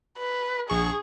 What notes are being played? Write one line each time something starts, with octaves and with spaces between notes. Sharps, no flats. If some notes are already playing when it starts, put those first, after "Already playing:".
B4
A#1 G#4 C#6